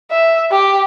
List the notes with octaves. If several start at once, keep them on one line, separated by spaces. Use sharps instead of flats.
E5
G4